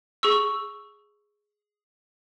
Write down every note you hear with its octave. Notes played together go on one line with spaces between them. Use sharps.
G#4 C#6 E6